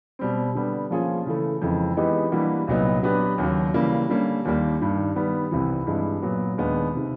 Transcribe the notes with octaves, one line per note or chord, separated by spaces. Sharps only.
B2 G3 C4
D3 G3 B3
F3 A#3 C#4 F4 G#4
C#3 E3 A3
F2 C#3 E3 G#3
E3 G#3 B3 D#4 G4
E3 G3 A#3 D4 F#4
C2 A#2 F#3 B3 D#4
F#3 B3 D4 G4 B4
D#2 C#3 F#3
C#3 E3 G3 A#3
D3 G3 A#3 C#4
D#2 D#3 G3 A#3
G2 D#3 G3
D#3 G3 B3
C2 C3 E3
G2 E3 G#3
A#2 F#3 B3
D#2 D#3 G#3 B3 D4
C3 D#3